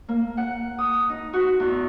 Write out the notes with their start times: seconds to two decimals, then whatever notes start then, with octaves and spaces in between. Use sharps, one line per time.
0.09 A#3
0.37 F#5
0.79 D#6
1.09 D#4
1.33 F#4
1.60 E2